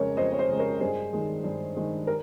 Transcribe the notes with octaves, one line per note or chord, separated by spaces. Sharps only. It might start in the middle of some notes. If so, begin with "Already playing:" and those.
Already playing: F2 C#3 G#3 A#4 C#5
F2 C5 D#5
C#5
C5 D#5
C#3 G#3
A#4 C#5
G2 G#4 C5
D#3 G#3
G2
D#3 G#3
A#4